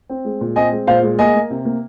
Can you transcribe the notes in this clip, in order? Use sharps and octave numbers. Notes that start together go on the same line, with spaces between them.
C4
G#3
A#2
C4 D#5 G#5
G#3
A#2 C5 F5
G#3
A#3 D#5 G#5
A#3
C3
A#3